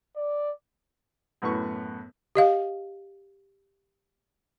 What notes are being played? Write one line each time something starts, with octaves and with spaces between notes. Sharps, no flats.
D5
F#2 A2 B3 F#4 B4 C#6
G4 D#5 F5